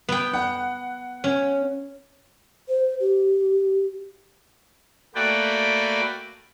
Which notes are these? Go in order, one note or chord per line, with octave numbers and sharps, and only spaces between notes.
B3 G5
F#5
C#4
C5
G4
A3 A#3 F#4 B4 D5 G5